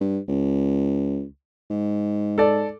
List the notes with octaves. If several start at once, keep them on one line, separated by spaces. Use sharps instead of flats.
G2
C#2
G#2
A4 D5